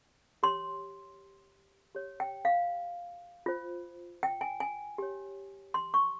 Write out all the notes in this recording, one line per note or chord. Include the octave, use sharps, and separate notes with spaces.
G4 C#5 C6
G4 C#5
G5
F5
F4 C5
G5
G#5
G#5
G4 C#5
C6
C#6